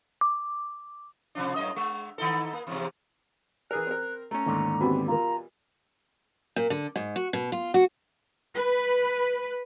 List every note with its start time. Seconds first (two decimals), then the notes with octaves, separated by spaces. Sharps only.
0.21 D6
1.35 C3 F3 D4
1.56 F#2 A2 D#5
1.76 G#3
2.18 D#3 D#4 A4
2.53 A#3
2.67 E2 G#2 C3
3.71 E3 G#4 A#4 F#6
3.87 C4 A#4
4.31 A3 C#4 A#5
4.46 D#2 G#2 D3
4.80 B2 E3 G3 C4 F#4 B5
5.08 F4 A#4 A#5
6.56 A#2
6.70 D3
6.96 G#2
7.16 F#4
7.33 B2
7.52 F4
7.74 F#4
8.56 B4